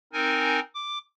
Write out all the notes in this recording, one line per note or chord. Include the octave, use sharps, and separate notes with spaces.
C4 D#4 A#4 G#5
D6